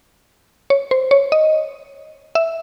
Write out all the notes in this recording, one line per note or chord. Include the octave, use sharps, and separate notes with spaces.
C#5
C5
C#5
D#5
E5